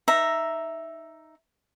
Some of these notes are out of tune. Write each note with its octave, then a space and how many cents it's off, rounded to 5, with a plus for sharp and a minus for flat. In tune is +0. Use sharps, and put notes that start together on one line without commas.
D#4 +0 E5 +0 A#5 +0